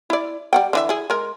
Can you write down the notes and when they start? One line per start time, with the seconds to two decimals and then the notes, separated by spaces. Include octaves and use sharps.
0.10 E4 D5
0.53 G3 F#5 G5
0.73 D3 E3 E5
0.89 E4 G#4
1.10 G#3 A#4